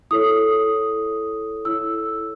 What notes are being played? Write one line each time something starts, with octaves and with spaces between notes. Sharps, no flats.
E4 A4 C#5 D#6
E4 A4 C#5 E6